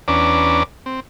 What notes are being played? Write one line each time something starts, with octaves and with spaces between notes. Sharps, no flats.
E2 C#4 D4 B4 A#5 D6
C4